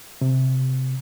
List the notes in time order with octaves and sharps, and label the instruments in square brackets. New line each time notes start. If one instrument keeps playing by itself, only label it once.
[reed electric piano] C3